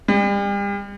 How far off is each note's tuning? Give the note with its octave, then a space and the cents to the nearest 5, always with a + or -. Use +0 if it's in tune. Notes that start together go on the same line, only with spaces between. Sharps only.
G3 +40